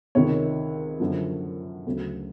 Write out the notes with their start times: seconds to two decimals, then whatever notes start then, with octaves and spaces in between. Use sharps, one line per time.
0.15 C#2 C3 D#3 C#5
1.00 F#2 D3 F3
1.86 D2 C#3 F#3